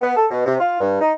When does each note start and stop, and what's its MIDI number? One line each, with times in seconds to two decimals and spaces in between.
0.02 0.17 59
0.17 0.26 69
0.31 0.44 47
0.46 0.55 48
0.60 0.79 65
0.81 1.01 43
1.01 1.12 63